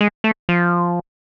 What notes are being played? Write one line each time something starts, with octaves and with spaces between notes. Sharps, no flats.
G#3
A3
F3